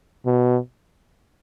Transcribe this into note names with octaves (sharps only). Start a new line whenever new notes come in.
B2